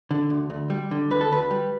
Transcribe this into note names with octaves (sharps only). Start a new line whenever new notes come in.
D3
D2
D2
G3
D3
D2 B4
A4
D2 B4
G3